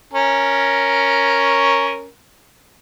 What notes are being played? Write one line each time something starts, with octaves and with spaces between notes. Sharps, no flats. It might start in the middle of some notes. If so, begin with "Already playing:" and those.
C#4 A#4